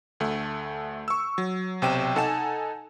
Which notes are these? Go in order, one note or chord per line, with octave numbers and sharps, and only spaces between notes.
D2 A3
C#6 E6
F#3
B1 C3 G5 D#7 E7
D#4 A4 F#5 G#5 A5 E7